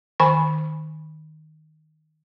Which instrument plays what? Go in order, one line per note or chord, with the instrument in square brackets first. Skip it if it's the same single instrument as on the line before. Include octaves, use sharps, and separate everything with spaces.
[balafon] D#3 G#5 B5